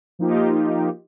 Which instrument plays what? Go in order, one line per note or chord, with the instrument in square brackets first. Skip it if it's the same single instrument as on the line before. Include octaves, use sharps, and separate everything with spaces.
[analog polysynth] F3 A#3 D#4 F4 G4